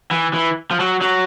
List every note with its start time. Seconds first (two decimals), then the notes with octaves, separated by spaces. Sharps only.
0.11 E3
0.34 E3
0.71 F3
0.80 F#3
1.01 F#3